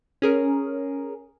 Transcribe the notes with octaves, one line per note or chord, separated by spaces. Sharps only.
C#4 G#4 A#4